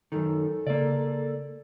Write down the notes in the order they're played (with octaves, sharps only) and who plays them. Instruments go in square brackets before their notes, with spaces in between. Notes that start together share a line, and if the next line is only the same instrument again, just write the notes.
[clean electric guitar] F#2 D#3 [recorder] A4
[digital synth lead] C#3 [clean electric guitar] A#3 D5